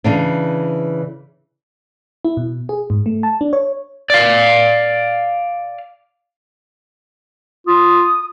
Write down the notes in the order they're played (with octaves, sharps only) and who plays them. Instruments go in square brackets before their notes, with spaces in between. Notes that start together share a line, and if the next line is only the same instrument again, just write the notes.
[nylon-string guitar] C#3 E3 D4
[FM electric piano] E4
B2
G#4
G#2
A3
A5
D4
C#5
[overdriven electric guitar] D5 F5
[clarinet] F4 [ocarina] D#6